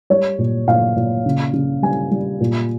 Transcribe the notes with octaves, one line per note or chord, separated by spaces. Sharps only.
G3 C#5
A#2
A#2 F5
A#2
C#3
C#3
G3 G#5
G3
A#2